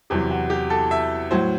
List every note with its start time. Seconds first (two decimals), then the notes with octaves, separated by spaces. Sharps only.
0.10 E2 C3 F#3 G4
0.31 F#4
0.50 G4
0.70 A4
0.91 E5
1.31 A2 F#3 C5